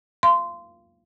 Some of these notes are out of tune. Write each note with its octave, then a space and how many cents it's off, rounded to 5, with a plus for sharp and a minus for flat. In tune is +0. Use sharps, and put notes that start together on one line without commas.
F5 -25 C6 -15